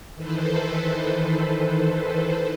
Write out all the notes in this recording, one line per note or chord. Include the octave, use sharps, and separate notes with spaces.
D#3 E3 A4 B4 C5